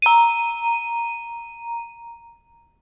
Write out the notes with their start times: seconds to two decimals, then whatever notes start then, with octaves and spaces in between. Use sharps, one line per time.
0.02 A#5 D#7